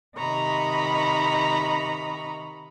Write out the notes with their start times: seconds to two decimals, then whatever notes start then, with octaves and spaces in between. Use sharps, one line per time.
0.18 C3 D#3 D#5 A#5 B5 C#6